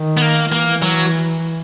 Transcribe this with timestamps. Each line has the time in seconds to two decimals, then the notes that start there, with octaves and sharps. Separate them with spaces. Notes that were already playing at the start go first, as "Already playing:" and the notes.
Already playing: D#3
0.17 B3
0.22 A#3
0.52 E3 A#3
0.82 F#3